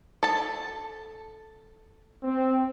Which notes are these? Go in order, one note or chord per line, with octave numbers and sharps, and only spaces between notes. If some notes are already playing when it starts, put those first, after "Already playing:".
A4 A5
C4